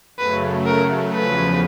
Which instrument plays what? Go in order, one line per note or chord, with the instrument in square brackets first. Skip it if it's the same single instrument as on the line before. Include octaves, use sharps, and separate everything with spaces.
[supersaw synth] F#2 C#3 F#3 A3 [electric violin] B4
[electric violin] A#4
[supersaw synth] E2 C#3 F3 [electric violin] B4